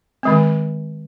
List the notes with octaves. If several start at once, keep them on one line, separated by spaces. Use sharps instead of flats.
D#3 G#3 C4